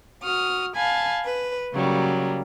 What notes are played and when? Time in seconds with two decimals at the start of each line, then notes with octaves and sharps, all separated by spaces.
0.22 F#4 D#6 F6
0.76 F5 G#5 A5 B5
1.24 B4
1.73 C#3 F#3 G3 A#3